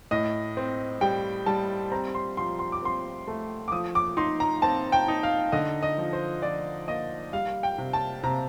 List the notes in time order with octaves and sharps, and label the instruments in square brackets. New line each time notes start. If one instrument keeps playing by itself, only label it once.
[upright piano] A2 D#5
C4
G3 G5
G3 A5
C4 A#5
C6
F3 C6
C6
D6
C4 C6
A3
D6
F3 D#6
D6
D#4 C6
A#5
C4 A5
G5
D#4
F5
D3 D#5
D#5
F3
C5
F3 D5
A#3 D#5
G3 F5
G5
C3
A5
C3 A#5